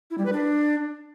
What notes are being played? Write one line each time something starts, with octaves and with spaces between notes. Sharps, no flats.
E4
G3
B4
D4